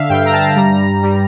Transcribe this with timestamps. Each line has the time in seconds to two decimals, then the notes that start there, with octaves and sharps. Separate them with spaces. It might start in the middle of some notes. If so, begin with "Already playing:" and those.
Already playing: D3 E5 F5
0.09 G2 G5
0.26 A#5
0.32 A5
0.56 G3 A#5
1.03 G3